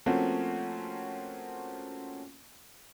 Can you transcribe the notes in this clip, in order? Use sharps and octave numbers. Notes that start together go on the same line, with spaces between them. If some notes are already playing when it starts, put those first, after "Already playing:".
F3 A3 A#3 C4 C#4 F#4